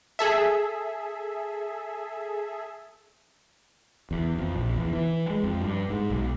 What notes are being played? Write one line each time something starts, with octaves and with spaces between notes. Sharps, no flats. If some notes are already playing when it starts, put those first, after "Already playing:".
G#4 A4 E5
E2
F2
A#1
E2
E3
G#3
F2
G2
G#2
B1